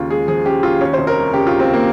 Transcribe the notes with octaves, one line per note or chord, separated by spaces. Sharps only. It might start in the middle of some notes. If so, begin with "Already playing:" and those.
Already playing: D#2 C#3 F4
G#3 G#4
F3 G#4
C#3 G4
D#2 F4
D#2 C#4
F1 C5
A#4
G3
C#3 G4
D#2 F4
C4
A#3